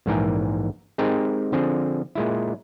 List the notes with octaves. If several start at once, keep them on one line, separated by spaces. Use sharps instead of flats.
A#1 G#2 E3 A#4 G5 G#5
G#3 C4 D#4 G4 G#4 A#4
D3 F3 C4 G#4
A#2 G#3 E4